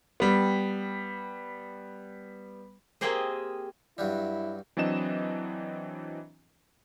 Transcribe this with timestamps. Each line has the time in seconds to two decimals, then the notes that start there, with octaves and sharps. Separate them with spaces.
0.20 G3 B3
3.01 A#3 C4 G4 G#4 C5 D#5
3.98 G2 F#3 G3 E4
4.77 E3 F#3 C4 D4 D#5 E7